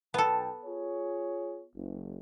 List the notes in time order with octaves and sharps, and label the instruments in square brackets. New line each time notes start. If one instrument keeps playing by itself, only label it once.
[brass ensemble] B1 G5 A5 [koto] B3 A4
[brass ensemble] F4 G#4 C#5
F#1